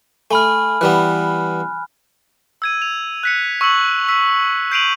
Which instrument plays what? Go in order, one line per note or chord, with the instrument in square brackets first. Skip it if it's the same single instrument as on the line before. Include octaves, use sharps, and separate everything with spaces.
[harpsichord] A3 [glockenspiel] G#5 B5 F6
[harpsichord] E3 G3 B3 [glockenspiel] F#6
[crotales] E6 G#6 D#7
F7
F#6 B6 C#7
C#6 E6 C#7 F#7
E6 B6
G6 C7 D7 D#7 F7 F#7